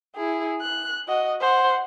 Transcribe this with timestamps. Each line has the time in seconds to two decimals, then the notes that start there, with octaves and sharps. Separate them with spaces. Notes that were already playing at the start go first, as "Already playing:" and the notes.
0.16 E4 G#4
0.61 F#6
1.08 F#4 D#5
1.41 C5 F#5